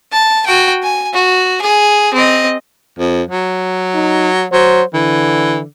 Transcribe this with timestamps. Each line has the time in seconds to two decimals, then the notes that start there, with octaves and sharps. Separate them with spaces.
0.12 A5
0.46 F#4 G5
0.83 G#5
1.14 F#4
1.62 G#4
2.14 C4 D#5
2.98 F2
3.30 F#3
3.94 D#4
4.52 F#3 C5
4.94 D3 E3